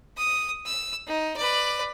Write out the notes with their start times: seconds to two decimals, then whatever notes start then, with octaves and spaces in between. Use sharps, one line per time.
0.17 D#6
0.65 E6
1.07 D#4
1.36 B4 D5